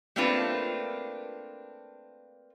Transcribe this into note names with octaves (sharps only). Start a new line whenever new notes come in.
A3 A#3 C4 D4 F4 B4